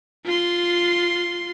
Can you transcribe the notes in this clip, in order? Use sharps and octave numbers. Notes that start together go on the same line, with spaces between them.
F4 C6